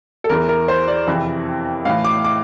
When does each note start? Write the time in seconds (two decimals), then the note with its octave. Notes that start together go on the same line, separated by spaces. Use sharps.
0.24 A4
0.29 E2 E3 A#4
0.49 A#4
0.68 C5
0.88 D5
1.07 F2 C3 E3
1.85 A2 E3 F5
2.04 D6
2.24 D6